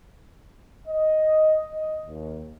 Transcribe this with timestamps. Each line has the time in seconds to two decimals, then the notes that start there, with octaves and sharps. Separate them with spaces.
0.88 D#5
1.73 D#5
2.06 D#2